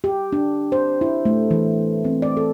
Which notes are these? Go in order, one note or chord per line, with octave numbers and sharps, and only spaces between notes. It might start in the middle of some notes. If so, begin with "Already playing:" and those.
G4
D4
C5
E4
A3
E3
C4
D5
A4